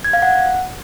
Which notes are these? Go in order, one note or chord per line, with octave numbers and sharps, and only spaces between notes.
G#6
F5
F#5